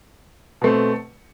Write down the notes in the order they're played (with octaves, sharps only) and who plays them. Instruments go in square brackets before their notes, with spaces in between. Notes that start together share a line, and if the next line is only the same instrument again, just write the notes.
[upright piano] B2 A3 C4